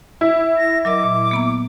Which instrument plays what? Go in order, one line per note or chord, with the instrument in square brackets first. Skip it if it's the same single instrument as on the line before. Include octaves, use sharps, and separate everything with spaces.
[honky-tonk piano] E4
[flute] A#6
[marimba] F#3 A#4 D#5 [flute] D6
[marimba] A#2
A#3 B3 A#5